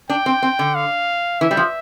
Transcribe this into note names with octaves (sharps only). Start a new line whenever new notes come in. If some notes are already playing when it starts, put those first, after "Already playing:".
D4 G5
C4
C4
D3
F5
E3 E5
G3
F3